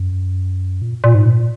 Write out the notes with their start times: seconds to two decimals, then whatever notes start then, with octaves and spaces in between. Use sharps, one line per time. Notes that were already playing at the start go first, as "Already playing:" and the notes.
Already playing: F#2
0.82 A#2
1.04 A#2
1.15 G#2
1.26 A#2